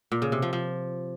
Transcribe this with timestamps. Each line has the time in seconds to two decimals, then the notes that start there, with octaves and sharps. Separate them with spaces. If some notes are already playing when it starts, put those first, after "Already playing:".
0.12 A#2
0.22 C#3
0.32 C3
0.42 F3
0.53 F3